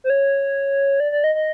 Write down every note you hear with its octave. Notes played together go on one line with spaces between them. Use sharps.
C5
C#5
D5
D5
D#5
D#5